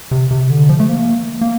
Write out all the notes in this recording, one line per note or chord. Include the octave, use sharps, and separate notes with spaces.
C3
C3
D3
F3
A3
A#3
A#3